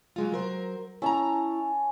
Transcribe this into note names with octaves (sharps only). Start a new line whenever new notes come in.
F#3 G#3 F4
F#3 A#4 C5
C#4 E4 A5 A#5